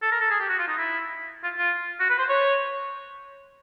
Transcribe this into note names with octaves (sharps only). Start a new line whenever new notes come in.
A4
A#4
A4
G#4
G4
F#4
F4
D#4
E4
F4
F4
F#4
B4
C5
C#5